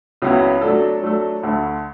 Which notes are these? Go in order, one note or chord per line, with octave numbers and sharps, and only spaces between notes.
C#2 C#3 F#3 B3 E4
F#3 A3 D4 A4
F#3 A3 D4 A4
D2 D3 A3